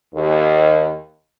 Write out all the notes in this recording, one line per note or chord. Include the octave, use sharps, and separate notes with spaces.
D#2